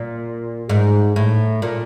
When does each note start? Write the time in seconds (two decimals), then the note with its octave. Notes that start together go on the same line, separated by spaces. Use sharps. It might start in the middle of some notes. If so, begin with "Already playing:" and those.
Already playing: A#2
0.69 G#2
1.16 A2
1.62 A#2